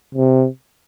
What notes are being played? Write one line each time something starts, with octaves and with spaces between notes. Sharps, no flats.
C3